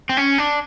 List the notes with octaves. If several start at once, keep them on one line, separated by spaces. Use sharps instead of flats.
C4
C#4
D4